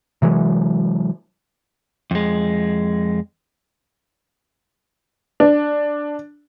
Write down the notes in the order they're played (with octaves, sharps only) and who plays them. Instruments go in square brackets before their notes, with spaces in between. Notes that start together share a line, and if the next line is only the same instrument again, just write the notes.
[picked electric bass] C3 E3 F#3 G#3
[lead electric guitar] F2 G#3
[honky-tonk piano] D4